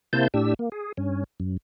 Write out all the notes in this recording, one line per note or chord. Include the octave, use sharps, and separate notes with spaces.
C3 A#3 E4 C5 A5 G6
A2 D4 G4 E6
A#3
G#4
G2 C#4
F#2